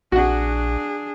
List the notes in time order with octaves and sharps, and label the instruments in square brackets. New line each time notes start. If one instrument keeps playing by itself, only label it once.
[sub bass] A#1 [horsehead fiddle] D4 G#4 [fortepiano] F#4 F#5